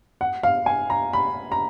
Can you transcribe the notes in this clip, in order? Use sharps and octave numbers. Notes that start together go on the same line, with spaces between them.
F#5
F5
G#5
A#5
B5
A#5